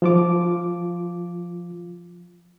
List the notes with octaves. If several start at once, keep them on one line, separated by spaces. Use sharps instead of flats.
F3 F4 D6